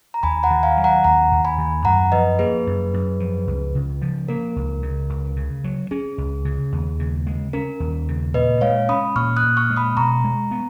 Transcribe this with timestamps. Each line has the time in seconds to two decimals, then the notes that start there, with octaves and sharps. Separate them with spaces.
0.14 A#5
0.23 D#2 G#5 B5
0.43 F#5 A#5
0.51 D#3
0.63 F5 G#5
0.77 F#3
0.84 F#5 A#5
1.04 D#2 F#5 A#5
1.32 D#2
1.45 G#5 B5
1.58 D#3
1.85 F#2 F#5 A#5
2.12 F3 B4 D#5
2.39 A#3 G#4 B4
2.67 F#2
2.94 F#2
3.20 F3
3.47 C#2
3.75 C#3
4.02 F3
4.28 A#3 A#4
4.56 C#2
4.83 C#3
5.09 C#2
5.36 C#3
5.64 F#3
5.91 C#4 G#4
6.18 C#2
6.45 C#3
6.72 D#2
6.99 C#3
7.27 G#3
7.53 C#4 A#4
7.80 D#2
8.08 C#3
8.34 A#2 B4 D#5
8.61 G#3 C#5 F5
8.89 C#4 B5 D#6
9.16 A#2 C#6 F6
9.36 D#6 F#6
9.43 A#2
9.57 C#6 F6
9.70 G#3
9.77 B5 D#6
9.97 B2 A#5 C#6
10.24 G#3
10.51 B3